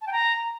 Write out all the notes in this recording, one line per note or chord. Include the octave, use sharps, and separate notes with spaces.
A5
G5
A#5